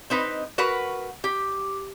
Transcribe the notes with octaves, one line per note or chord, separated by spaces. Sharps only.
C4 D#4 B4 D#5
F#4 A#4 B4 F#5
G4